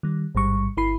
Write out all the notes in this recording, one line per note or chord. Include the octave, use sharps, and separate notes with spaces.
D#3 G3
A1 G#2 G3 C#6
G1 E4 B5 C7